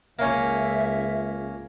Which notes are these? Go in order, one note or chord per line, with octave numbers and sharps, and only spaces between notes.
C#2 A#3 C#4 E5